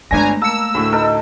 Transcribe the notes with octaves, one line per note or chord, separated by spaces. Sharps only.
G1 G#3 A3 D4 G#5 A#5 A#6
A#3 A#4 A5 E6 C#7
D2 A2 B5 C#6
D#4 A4 A#4